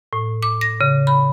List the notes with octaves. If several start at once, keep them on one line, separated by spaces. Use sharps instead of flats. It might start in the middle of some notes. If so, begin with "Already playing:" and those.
A2
D6
A#6
C#3
B5